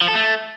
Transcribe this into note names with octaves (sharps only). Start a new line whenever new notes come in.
F3
A4
A3